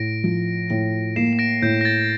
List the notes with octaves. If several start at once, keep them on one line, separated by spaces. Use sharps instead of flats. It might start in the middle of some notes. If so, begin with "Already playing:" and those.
Already playing: A2 A#6 D7
F3
A2
A#3 C7 E7
E7
A#6 D7
A2 G6
A#6
A6